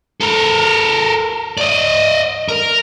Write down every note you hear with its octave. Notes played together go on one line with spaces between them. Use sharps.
A4 A#4
D5 D#5
A#4